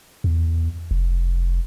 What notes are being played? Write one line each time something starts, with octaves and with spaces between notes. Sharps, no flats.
E2
F1